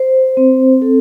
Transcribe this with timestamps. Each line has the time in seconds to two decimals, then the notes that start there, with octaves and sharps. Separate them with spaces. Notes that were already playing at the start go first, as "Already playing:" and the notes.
Already playing: C5
0.37 C4
0.82 A4